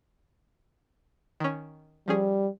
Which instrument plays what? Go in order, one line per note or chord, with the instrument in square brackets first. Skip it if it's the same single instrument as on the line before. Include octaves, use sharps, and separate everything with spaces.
[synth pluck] D#3 C#4
[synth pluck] F3 C#4 G#4 [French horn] G3